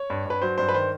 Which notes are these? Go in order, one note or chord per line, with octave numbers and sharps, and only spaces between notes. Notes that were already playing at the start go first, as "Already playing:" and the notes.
Already playing: C#5
G2
G2 B4
F#3 C5
G2 C5
B4
D#3 C5